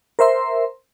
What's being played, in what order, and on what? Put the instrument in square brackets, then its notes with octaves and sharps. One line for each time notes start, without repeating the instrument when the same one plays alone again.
[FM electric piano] A#4 C5 E5 C6